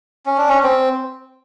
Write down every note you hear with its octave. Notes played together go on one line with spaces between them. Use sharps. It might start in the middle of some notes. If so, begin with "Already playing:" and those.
C#4
D4
C#4
C4